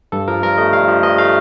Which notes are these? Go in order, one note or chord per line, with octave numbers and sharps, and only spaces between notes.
G2 A4
F3 A#4
G2 A#4
A3 D#5
G2 F5
F3
G2 D#5
A3 F5